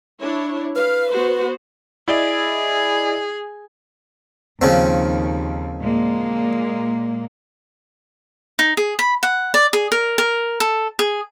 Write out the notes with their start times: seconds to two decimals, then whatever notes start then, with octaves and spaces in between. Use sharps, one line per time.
0.20 D4 E4 C#5
0.75 B4 F5
1.11 B3 F#4 C5
2.08 E4 G#4 D5 D#5
4.61 D#2 C#3 F3 C4
5.81 A#2 G#3 A#3
8.59 D#4
8.77 G#4
8.99 B5
9.23 F#5
9.54 D5
9.73 G#4
9.92 A#4
10.18 A#4
10.60 A4
10.99 G#4